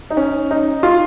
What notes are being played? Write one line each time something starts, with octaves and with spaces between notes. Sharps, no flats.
D#4
C#4
D#4
F4